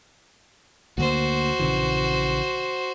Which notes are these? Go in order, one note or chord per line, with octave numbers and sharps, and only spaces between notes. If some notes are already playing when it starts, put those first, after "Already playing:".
D2 D3 A#3 F#4 C5
A#1 C#3 E3